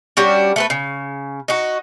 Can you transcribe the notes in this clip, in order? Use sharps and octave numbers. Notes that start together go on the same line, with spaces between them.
G3 C#4 D4 F#4
A3 A4 B4
C#3
D#4 F#4